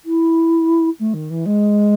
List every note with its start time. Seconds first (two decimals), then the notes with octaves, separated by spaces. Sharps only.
0.05 E4
0.99 A3
1.13 D#3
1.30 E3
1.46 G#3